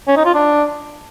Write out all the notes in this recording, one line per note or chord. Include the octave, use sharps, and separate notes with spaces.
C#4
D#4
F4
D4